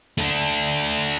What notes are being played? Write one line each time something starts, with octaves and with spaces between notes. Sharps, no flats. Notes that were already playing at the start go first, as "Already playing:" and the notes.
A3 D4